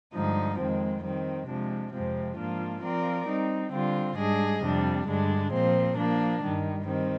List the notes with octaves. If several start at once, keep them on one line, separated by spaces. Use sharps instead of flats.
G2 D3 F3 G#3 D#4
F2 D#3 G#3 C4
D#3 G3 C4
C3 F3 G#3 D4
F2 C3 F3 G#3 C4
G#2 F3 A#3 D4 F4
F3 C4 F4 A#4 D5
G3 C4 D#4
D3 G3 C4 F4
G#2 G3 D4 G#4 D#5
F2 C3 G3 D4
G2 D3 G#3 D4
A#2 F3 C4
F3 A#3 D4
G2 D#3 G3
D#3 G3 C4